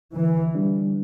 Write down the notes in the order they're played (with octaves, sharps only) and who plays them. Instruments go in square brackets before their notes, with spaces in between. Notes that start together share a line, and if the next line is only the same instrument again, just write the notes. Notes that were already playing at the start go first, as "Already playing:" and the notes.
[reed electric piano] D3 [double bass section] E3
[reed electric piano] G3 D4